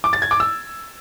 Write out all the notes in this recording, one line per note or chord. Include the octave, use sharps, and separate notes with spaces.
D6
A6
G#6
D6
E6